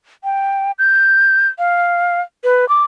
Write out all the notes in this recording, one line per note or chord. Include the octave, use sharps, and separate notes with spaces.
G5
G6
F5
B4
D6